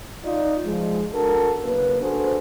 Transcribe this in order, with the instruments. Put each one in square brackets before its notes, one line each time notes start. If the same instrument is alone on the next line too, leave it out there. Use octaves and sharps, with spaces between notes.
[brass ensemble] D#4 F4 D5
F3 G#3
D4 F#4 A4 A#4
F#1 A#3 B3 B4
D4 F#4 G#4 A4 C5